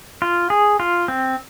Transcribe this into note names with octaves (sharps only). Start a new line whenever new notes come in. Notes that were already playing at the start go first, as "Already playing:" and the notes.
F4
G#4
F4
C4